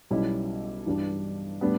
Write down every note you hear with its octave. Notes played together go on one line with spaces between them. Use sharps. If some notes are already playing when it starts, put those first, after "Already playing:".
B1 B2 G3 C#4 E4
G2 E3 G3 D4
A2 G3 B3 D4